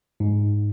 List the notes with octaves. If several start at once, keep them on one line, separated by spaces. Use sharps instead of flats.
G#2